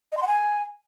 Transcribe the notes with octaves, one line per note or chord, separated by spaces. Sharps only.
D#5
C6
F#5
G#5